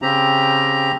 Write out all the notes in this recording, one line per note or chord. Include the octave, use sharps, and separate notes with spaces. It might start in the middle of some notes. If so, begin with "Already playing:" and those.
C#3 C4 G4 A#5